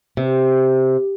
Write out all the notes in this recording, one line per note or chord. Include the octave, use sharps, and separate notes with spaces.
C3